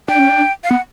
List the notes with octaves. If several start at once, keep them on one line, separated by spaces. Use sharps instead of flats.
D4 G5
C#4
D4
F5
B3 F#5